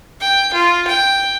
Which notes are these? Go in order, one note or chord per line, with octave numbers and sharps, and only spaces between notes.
G5
F4
G5